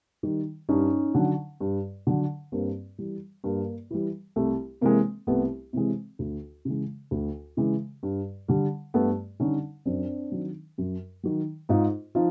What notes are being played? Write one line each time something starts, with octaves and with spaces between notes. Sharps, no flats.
D#3 G3
G2 C#4 D#4
D3 F#3
G2
D3 F#3
G2 A#3 C4
E3 G3
G2 A#3
E3 G3
C2 A3
C3 E3 G#3 A#3
C2 A3 B3
C3 E3 G#3
D2
C#3 E3 G#3
D2
C#3 E3 G#3
G2
D3 G3
G2 A3 B3
D3 G3 C#4 D#4
F#2 C4 D4
D#3 F#3
F#2
D#3 F#3
G#2 D#4 F4
F3 D#4 F4